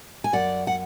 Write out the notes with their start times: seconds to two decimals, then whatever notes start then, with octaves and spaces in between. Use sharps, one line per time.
0.24 G#5
0.33 F#2 D5 F#5
0.67 F#5